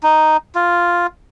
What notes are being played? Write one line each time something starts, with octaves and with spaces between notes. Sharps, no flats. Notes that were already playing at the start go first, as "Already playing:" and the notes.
D#4
F4